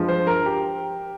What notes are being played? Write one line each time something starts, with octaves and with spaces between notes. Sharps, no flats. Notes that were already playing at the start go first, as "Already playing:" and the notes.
Already playing: G2 F3 G#3
C5
A#4
G4